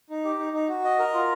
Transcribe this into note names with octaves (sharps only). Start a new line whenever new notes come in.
D#4
G4
D#4
D#4
F#4
D#5
A#4
F4